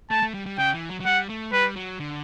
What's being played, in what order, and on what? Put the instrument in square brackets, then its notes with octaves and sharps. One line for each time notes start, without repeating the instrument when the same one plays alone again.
[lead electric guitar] A3 [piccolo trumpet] A5
[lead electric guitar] A3
G3
G3
[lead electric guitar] C#3 [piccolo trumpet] G5
[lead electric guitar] E3
F#3
F#3
[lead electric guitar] G3 [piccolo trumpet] F#5
[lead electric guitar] A3
[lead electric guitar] G3 [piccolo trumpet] B4
[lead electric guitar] F#3
D3